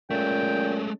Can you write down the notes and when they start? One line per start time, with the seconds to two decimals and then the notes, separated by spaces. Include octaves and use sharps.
0.10 A#2 G#3 A3 C#4 G5